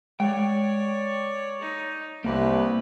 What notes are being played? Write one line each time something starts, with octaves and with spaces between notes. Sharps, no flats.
G#3 C#5 D5 G5
D#4
C2 A#3 G4 B4